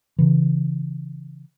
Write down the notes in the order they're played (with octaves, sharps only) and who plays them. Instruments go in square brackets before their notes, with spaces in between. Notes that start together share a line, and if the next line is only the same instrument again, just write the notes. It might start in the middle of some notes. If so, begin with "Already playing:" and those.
[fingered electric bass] C#3 E3